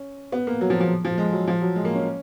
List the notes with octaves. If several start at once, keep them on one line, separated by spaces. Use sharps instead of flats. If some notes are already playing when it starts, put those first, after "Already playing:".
Already playing: C#4
B3
A#3
F#3
F3
F3
F3
G#3
F#3
F3
F#3
G#3
A#3
C#4